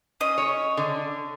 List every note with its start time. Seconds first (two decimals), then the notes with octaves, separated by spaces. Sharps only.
0.21 C#4 D#5
0.38 C#5
0.77 D3